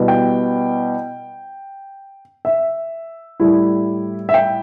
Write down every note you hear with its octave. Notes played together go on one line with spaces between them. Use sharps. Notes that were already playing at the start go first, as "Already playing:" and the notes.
Already playing: B2 G3 B3 E4
G5
E5
A2 G3 E4
E5
G5